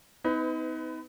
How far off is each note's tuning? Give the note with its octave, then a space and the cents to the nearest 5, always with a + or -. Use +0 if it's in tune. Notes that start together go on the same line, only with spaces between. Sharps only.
B3 +45 D#4 +35 B4 +25